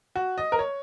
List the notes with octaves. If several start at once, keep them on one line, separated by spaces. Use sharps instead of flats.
F#4
D#5
A#4
C#5